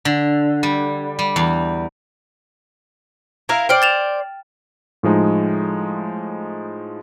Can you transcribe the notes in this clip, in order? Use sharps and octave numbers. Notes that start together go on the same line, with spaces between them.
D3
G3
G3
E2
E4 A#4 F5
C5 D5 G5 F6 D7
A6 E7 F7
A2 F3 G#3 D#4